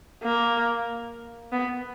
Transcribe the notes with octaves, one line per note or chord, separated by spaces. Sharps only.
A#3
B3